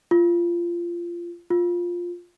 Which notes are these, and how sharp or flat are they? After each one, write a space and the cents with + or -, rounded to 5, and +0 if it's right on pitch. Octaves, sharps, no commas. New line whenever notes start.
F4 -20
F4 +5